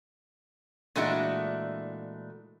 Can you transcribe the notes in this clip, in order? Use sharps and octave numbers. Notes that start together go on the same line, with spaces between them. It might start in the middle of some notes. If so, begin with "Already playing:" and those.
A#2 E3 G#3 A3 D4 F#4